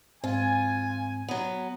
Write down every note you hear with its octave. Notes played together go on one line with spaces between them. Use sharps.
G#2 C4 F4 G#5
F#3 B3